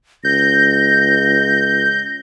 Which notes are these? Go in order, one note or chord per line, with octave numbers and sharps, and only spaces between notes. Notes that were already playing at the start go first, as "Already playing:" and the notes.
C#2 G6 A#6